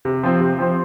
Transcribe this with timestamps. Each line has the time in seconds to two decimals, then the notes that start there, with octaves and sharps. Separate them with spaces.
0.05 C3
0.23 F3 C4
0.41 C3
0.59 F3 C4